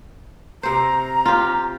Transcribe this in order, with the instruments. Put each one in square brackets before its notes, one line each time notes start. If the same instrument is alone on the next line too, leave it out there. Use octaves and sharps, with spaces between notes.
[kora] C3 C5 [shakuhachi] A#5
[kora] F4 G4